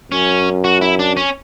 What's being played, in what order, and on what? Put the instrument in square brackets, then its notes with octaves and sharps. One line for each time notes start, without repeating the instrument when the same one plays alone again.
[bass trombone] F#2 [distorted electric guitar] C#4
[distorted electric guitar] F#4
E4
D4
C#4